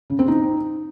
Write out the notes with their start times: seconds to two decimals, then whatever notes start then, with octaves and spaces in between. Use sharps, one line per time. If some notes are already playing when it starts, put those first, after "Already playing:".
0.10 C#3
0.19 C4
0.28 D#4